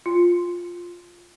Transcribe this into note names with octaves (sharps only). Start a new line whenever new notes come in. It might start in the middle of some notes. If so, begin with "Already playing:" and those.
F4